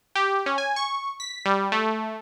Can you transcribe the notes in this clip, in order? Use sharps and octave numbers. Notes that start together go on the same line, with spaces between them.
G4
C#4
G#5
C#6
B6
G3
A3